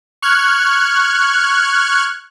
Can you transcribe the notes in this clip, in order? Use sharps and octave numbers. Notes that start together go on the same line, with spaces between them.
C#6 F6 F#6 G#6